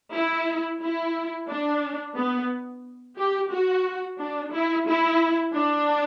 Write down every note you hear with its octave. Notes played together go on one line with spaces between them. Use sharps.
E4
E4
D4
B3
G4
F#4
D4
E4
E4
D4